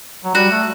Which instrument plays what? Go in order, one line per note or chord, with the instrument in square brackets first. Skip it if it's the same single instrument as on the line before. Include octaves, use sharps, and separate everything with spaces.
[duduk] F#3
[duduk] G3 [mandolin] F#4
[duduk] A3